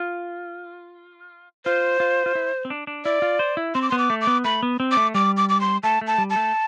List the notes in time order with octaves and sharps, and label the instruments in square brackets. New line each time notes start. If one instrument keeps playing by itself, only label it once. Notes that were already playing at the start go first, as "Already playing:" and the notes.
Already playing: [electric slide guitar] F4
[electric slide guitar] F4 [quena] C5
[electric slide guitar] F4
F4
E4
C4
D4
D4
[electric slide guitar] E4 [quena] D5
[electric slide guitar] F4
C5
E4
[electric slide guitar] C4 [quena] C6
[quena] D6
[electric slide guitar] B3 [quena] C6
[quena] D6
[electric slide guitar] A3
[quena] D6
[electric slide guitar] B3
[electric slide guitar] A3 [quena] B5
[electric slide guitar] B3
C4
[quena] D6
[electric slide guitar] A3
[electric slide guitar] G3 [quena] D6
[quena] D6
D6
C6
[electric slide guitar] A3 [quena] A5
[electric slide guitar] A3
[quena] A5
[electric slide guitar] G3
[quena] A5
[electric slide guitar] A3